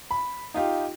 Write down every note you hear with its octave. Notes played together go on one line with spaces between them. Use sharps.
B5
D#4 F4 G4